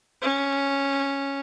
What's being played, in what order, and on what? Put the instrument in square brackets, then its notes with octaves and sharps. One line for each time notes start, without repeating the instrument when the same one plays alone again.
[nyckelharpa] C#4